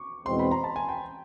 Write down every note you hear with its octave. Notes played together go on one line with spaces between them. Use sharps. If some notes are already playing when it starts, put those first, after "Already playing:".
Already playing: C#6 D6
E2 B2 G#3 C4 C6
B5
A#5
A5
G#5
G5